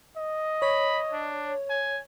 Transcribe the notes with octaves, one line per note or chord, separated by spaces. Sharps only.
D#5
C#5 B5
D4
G#5